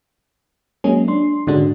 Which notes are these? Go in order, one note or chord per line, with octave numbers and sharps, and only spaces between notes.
F#3 G#3 A#3 C#4 G#4
D4 C6
G#2 D3 G#3 C#4 D4 F#4